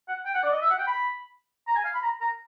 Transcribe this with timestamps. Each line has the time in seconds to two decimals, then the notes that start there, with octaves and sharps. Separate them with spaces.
0.08 F#5
0.25 G5
0.34 F#5
0.43 D5
0.52 D#5
0.61 E5
0.70 F#5
0.79 G5
0.87 B5
1.67 A#5
1.76 G#5
1.84 F5
1.94 B5
2.02 A#5
2.21 A#5